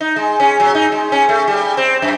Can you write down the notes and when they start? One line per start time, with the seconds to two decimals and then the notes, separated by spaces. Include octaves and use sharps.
0.01 D#4
0.16 G#3
0.40 C#4
0.60 F#3
0.75 D#4
0.92 G#3
1.12 C#4
1.29 A3
1.48 G3
1.77 C4
2.02 F#2